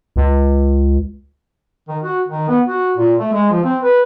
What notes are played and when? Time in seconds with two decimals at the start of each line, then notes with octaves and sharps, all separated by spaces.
0.16 C#2
1.88 D#3
2.03 F#4
2.28 D#3
2.48 B3
2.67 F#4
2.97 A#2
3.19 A3
3.32 G#3
3.50 F3
3.64 C4
3.83 B4